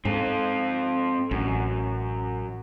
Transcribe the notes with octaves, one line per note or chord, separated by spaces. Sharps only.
G#2 C4 A4
A1 F#2